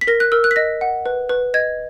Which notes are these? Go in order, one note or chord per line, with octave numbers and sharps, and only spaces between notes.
B6
A#4 A#6
F#6
A#4 E6
F#6
B6
D#5 A#6
F#5
B4
B4
D#5 G#6